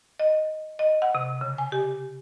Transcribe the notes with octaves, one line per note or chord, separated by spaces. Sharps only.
D#5
D#5
F#5
C3
C#3
G#5
G4